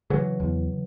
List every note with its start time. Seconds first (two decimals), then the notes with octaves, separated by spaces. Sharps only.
0.10 C#3 E3 F#3
0.40 E2